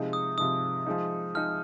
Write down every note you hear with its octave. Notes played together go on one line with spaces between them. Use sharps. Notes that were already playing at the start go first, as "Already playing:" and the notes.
Already playing: C3 F3 G#3 D#4
D#6
C3 F3 G#3 D#4 D#6
F3 G#3 D#4
F3 G#3 D#4 F6